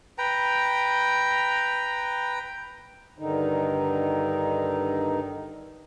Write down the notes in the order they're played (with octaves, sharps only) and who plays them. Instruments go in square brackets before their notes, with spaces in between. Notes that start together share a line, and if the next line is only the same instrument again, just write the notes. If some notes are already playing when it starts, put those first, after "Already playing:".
[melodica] B4 G5 A#5
[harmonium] G2 D3 D#3 D#4